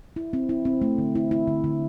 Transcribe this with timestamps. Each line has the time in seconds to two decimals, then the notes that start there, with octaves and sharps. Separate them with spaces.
0.16 E4
0.33 C4
0.49 E4
0.65 C4
0.82 A3
0.98 D3
1.15 E4
1.31 E4
1.47 D3
1.64 D3